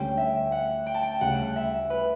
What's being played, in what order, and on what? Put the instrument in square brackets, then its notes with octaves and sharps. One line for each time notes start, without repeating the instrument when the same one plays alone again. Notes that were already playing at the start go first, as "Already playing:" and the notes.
Already playing: [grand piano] D2 D3 G3 C#4 [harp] G5
[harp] E5
F#5
G5
A5
G5
[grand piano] D2 C#3 G3 [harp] F#5
[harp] E5
B4